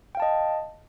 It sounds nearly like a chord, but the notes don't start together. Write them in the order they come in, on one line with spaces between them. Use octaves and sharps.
G5 F5 A5 D#5